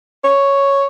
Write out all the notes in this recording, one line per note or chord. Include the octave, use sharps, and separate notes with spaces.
C#5